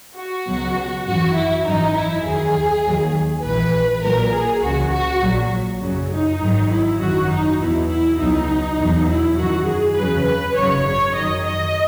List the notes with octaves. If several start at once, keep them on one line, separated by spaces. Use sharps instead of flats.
F#4
C#2 B2 F#3
G#1 F#2 E3 F#4
E4
G#1 F#2 E3 D#4
E4
D#2 D#3 F#3 G#4
D#2 D#3 F#3
A#1 G#2 E3 B4
A#1 A#2 F#3 A#4
G#4
C#2 C#3 E3 F#4
F#4
A#1 A#2 F#3
F#2 C#3 F#3
D#4
G#1 G#2 D#3 F#3
E4
G#1 F#2 D#3 F#3 F#4
D#4
E2 B2 F#3 E4
E4
C#2 B2 F#3 D#4
E2 B2 F#3
E4
F#2 D#3 F#3 F#4
G#4
E2 C#3 F#3 B4
B4
G#1 F#2 C#3 F#3 C#5
C#5
F#2 D#3 F#3 D#5
D#5